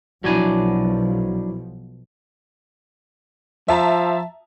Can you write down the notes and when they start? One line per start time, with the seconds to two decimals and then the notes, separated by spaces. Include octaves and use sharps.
0.24 B1 B2 F3 F#3 D4 E4 F#4 G#5
3.68 F3 E5 A5 A#5